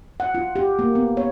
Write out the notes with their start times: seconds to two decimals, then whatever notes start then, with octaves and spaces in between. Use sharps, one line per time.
0.20 F#5
0.35 F4
0.56 G4
0.79 A#3
0.95 B3
1.17 C#5